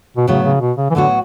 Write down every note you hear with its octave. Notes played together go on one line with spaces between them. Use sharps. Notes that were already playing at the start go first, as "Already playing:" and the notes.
B2
A2 C#3 F#3 B3 F#4
C#3
B2
C#3
E3
A2 D3 F#3 B3 F#4